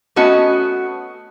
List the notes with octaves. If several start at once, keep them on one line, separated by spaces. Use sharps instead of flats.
A3 B3 C#4 F#4 D#5